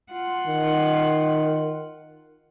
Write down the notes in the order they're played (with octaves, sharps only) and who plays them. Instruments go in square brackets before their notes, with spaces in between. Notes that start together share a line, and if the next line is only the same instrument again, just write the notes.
[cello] F4 F#5
[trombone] D#3